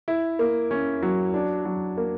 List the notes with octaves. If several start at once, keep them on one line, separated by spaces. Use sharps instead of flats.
E4
A#3
C#4
F#3
D4
F#3
A#3